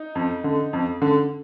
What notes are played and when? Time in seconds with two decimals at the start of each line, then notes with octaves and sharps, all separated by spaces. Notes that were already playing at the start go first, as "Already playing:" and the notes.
Already playing: D#4
0.15 F2
0.44 D3
0.73 F2
1.02 D3